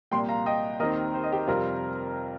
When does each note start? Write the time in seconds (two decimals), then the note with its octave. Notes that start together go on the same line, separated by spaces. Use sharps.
0.11 C2 A#2 A#3 G5 C6
0.29 F5 A#5
0.46 D#5 G5
0.79 D#2 D#3 C4 A#4 D#5
1.14 C5
1.23 D#5
1.32 G4 C5
1.47 F2 C3 G3 C4 F4 A#4